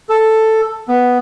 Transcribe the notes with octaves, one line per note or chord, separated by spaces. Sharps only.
A4
B3